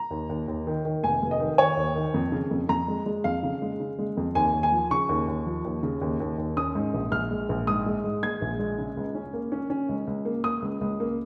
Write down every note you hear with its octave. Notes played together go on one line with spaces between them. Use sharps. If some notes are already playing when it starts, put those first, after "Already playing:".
Already playing: A#5
D#2
D#2
D#2
D#3
D#3
F1 G#5
F1
D#5
D#3
D#3 C#5
D#2
D#3
F2
C#3
F2
F2 A#5
G#3
G#3
F2 F5
C#3
G#3
C#3
G#3
F2
D#2 G#5
D#2
G#5
F3
C#3 C#6
D#2
D#2
F3
D#2
C#3
D#2
D#2
D#2
C#4 D#6
G#2
A#1
A#1 F6
G#3
A#1
G#2 D#6
G#3
G#2
G#3 G#6
A#1
G#3
C#3
C#2
C#4
A#3
C#4
C#4
C#2
C#2
A#3
A#3 D#6
C#2
C#2
A#3